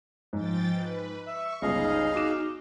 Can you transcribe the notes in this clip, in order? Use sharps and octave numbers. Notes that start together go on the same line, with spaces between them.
G#2 F3 G5 A6
B4
E5 C#6
G1 C#2 D#4 G#4 D#5 F5
F#4 D6 E7